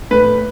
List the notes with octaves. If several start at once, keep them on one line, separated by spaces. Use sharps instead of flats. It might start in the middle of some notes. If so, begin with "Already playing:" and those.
A2 B4